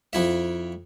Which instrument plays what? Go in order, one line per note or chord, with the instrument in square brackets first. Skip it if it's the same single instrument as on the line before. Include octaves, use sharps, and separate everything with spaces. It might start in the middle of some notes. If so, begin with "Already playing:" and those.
[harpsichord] F2 E4 E5